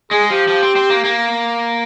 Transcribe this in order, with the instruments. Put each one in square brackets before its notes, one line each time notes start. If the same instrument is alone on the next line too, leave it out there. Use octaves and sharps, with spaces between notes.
[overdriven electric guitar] G#3 [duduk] G#4
[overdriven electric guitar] F3 [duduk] G4
[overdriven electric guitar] F3
C4
C4
A#3
A#3